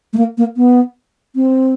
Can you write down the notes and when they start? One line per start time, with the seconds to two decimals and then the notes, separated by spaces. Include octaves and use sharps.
0.13 A3
0.17 A#3
0.38 A#3
0.57 B3
1.35 C4